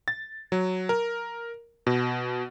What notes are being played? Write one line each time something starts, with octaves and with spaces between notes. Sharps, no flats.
A6
F#3
A#4
B2